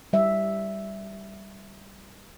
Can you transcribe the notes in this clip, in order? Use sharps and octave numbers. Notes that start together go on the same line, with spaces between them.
G3 E5